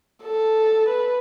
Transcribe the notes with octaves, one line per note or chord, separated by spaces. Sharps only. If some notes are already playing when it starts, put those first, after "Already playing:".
A4
B4